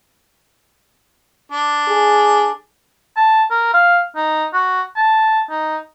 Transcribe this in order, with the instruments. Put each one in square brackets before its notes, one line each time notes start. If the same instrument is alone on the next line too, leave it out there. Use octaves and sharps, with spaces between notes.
[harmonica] D4
[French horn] G#4
[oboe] A5
A#4
F5
D#4
F#4
A5
D#4